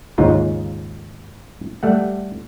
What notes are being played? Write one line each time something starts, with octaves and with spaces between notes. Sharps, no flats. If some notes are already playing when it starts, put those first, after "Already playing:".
D#2 G#2 C#3 D#4 F4
G3 A3 F#5